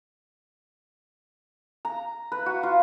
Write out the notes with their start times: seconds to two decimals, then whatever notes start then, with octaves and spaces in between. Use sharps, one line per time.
1.85 A#5
2.32 B4
2.46 F#4
2.63 F4